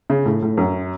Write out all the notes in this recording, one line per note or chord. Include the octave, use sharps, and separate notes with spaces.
C#3
A2
A2
F#2